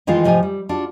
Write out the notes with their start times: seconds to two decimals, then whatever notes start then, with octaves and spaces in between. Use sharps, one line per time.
0.07 D#3 E3 G#3 D#4 F4
0.24 G#2 C3 F3 D#5 G#5
0.43 G3
0.69 D4 F4 F#4